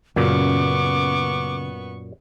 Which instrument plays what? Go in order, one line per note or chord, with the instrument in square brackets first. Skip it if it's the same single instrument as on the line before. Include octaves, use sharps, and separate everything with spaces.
[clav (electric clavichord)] F#2 A#2 [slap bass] C#3 [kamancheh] B3 C#6 [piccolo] D6